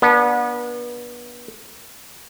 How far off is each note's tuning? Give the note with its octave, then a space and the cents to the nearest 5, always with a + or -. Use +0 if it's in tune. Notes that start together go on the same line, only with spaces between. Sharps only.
B3 -30 D4 +0